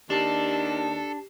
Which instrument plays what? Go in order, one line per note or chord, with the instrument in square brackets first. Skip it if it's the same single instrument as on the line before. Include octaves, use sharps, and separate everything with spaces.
[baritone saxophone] D#2 [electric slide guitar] D4 [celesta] G4 C7 E7 [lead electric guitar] A4